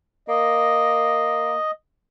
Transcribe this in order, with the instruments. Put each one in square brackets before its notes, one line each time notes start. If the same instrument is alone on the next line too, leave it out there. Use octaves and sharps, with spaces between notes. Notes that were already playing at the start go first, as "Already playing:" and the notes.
[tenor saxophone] A#3 [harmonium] D#5